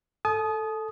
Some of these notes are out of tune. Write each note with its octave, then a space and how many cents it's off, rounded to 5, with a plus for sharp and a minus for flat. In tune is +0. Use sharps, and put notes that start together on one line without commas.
A4 +0 A5 -40 D#6 +0